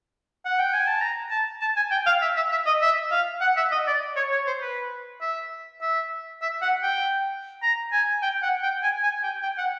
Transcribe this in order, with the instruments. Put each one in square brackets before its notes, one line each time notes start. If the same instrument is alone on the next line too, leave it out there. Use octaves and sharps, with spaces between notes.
[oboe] F#5
G5
G#5
A5
A#5
A5
A5
G#5
G5
F5
E5
E5
E5
D#5
E5
F5
F#5
E5
D#5
D5
C#5
C#5
C5
B4
E5
E5
E5
F#5
G5
A#5
G#5
G5
F#5
G5
G#5
G#5
G5
G5
F#5